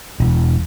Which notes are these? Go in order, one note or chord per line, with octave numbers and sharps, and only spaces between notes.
E1